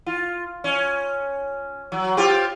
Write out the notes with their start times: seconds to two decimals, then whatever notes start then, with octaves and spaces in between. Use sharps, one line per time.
0.06 F4
0.64 C#4
1.92 F#3
2.17 C4 F4 G4